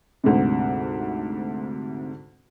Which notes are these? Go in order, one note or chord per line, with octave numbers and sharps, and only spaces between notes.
D2 G#2 C3